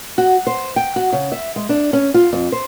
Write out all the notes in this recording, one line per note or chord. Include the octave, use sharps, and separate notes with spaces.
F#4
C5
G5
F#4
C#3
E5
G#3
D4
C#4
F4
F2
C5